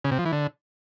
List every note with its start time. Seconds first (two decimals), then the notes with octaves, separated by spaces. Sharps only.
0.04 C#3
0.11 C3
0.18 F3
0.25 E3
0.32 D3